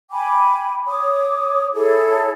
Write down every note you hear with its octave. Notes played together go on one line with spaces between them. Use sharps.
G5 G#5 B5 D6
C#5 D6 D#6
E4 G#4 A4 C#5